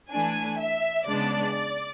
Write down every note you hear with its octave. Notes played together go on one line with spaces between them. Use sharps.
E3 A3 D4 G#5
E5
C#3 G#3 B3 D4 D5